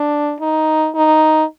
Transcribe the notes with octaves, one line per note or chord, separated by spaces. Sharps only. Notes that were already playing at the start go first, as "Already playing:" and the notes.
Already playing: D4
D#4
D#4